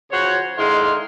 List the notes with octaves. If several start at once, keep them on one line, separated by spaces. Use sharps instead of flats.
C#3 F3 F#4 C5 C#5
D3 D#3 G#3 E4 F5 C6